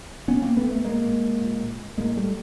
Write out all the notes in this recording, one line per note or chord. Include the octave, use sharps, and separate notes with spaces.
B2 B3 C#4
A#3 C4
A3 B3
A3 B3
A#2 G#3 A#3
A#2
A2 G#3 A#3
G3 A3